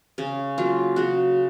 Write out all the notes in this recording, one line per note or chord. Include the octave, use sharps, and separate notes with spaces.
C#3 C#4
F#3 A#3 F4
C#3 F#4